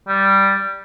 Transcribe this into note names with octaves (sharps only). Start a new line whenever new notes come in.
G3